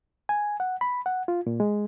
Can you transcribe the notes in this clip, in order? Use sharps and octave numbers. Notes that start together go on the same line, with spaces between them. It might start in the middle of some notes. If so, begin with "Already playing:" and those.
G#5
F#5
B5
F#5
F4
A#2
G#3